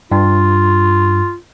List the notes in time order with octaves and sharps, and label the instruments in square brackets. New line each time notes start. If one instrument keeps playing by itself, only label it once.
[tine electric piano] G2 [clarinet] F4